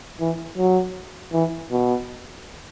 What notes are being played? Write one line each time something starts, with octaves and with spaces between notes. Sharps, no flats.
E3
F#3
E3
B2